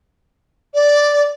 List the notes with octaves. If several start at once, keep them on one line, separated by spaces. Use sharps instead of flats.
D5